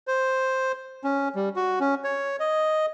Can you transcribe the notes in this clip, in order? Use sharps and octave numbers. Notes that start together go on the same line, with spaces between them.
C5
C#4
G3
F#4
C#4
C#5
D#5